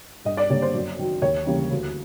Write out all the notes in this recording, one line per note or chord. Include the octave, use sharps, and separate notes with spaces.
G2 D#5
D5
D3 G3 A#3 C#5
C5
F#2
D#3 F#3
D#2 C#5
C#3 E3 G3 A#3
D2